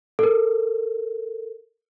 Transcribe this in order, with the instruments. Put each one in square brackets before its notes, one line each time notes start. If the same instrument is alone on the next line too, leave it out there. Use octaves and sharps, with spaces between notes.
[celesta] A4 A#4